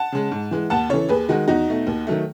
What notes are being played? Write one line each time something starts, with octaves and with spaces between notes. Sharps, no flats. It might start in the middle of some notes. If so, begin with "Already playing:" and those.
Already playing: F#5 A5
C#3 G#3
G#2
E3 G#3
D#2 F#5 A5
C#3 E3 A4 C#5
D#2 G#4 B4
D#3 G#3 D#4 F#4
E2 D#4 F#4
B2 A3
D#2
D#3 F#3 A3